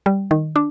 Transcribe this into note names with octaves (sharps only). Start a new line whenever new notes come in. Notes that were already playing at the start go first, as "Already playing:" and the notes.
G3
D#3
D4